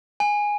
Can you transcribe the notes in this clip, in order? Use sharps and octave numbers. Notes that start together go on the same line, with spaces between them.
G#5